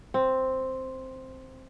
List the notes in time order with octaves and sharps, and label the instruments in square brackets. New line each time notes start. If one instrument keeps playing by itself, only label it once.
[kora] C4